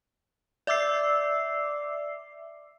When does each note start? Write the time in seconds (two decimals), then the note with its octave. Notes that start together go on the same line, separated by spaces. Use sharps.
0.67 D5 E5 D6 E6 C7